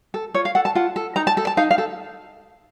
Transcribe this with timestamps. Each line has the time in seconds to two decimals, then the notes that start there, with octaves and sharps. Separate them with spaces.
0.14 A4
0.34 F4 C#5
0.45 F5
0.55 A4 F#5
0.65 A5
0.75 F4 F#5
0.96 A4
1.16 D#4 A#5
1.27 A5
1.37 A4
1.47 A5
1.57 D#4 F5
1.71 F5
1.78 A4